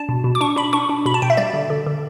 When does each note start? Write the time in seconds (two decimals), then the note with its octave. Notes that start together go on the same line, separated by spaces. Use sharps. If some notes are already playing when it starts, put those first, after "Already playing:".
Already playing: D4 A5
0.09 B2
0.24 B2
0.35 D6
0.41 D4 C#6
0.56 D4 B5
0.73 D4 C#6
0.89 D4
1.06 B2 B5
1.14 A5
1.22 B2 G5
1.30 E5
1.37 G3 D5
1.54 D3
1.70 D3
1.87 D3